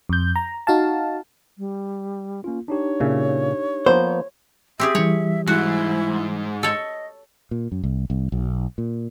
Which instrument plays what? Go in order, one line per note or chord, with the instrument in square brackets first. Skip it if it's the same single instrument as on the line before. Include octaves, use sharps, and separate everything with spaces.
[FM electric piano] F2 G6
A#5
D#4 F#4 F5 A5
[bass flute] G3
[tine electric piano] A#3 F4 [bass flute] C#4
[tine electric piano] D4 D#4 G4 [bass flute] C#5
[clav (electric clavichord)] A#2 C#3 E5
[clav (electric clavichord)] F3 A#3 B3 [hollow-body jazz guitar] C5
[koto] C4 G4 G#4 [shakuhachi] E5
[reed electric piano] E3 G3 [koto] C#5
[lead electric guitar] G#2 [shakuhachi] E4 [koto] F#4
[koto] A4 C#5 [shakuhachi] D#5
[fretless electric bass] A#2
F#2
C2
C2
B1
A#2